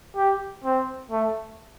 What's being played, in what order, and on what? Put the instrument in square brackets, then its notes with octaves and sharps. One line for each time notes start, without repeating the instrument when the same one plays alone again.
[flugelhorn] G4
C4
A3